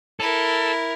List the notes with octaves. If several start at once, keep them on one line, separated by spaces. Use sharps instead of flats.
E4 A4 A#4